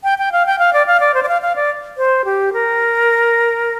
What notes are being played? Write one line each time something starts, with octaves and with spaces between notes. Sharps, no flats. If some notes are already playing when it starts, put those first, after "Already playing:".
G5
G5
F5
G5
F5
D5
F5
D5
C5
D5
F5
F5
D5
C5
G4
A#4